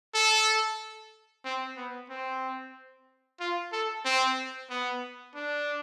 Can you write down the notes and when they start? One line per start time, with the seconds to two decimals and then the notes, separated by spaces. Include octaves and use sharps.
0.14 A4
1.45 C4
1.77 B3
2.10 C4
3.40 F4
3.72 A4
4.05 C4
4.70 B3
5.35 D4